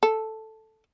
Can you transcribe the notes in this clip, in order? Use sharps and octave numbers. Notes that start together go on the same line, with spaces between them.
A4